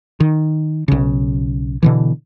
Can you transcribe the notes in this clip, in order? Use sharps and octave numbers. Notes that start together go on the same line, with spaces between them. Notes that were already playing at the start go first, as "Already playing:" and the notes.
D#3
B1 C#3
B2 D3 E3